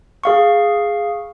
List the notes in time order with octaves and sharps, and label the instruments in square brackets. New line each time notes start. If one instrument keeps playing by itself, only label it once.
[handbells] G#4 F5 C#6